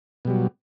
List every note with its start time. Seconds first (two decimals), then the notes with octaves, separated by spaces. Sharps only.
0.25 B2
0.27 G3
0.30 F#3